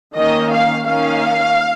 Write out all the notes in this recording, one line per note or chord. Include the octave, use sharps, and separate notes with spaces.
D#3 A#3 C#4 D#5
F5
D#3 A#3 C#4 F5